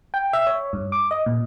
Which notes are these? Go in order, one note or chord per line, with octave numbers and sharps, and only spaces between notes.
G5
E5
C#5
G2
D6
D#5
A#2